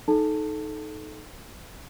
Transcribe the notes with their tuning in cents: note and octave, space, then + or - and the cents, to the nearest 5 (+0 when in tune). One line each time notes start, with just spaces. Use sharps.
D#4 +0 A4 -20 A5 +20